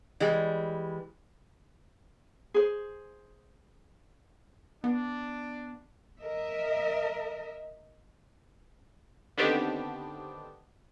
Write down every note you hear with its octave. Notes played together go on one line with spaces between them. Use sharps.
E3 G3 G#3
G#4 C5
B3 D4
A#4 D#5 E5
D3 D#3 B3 C4 D4 G4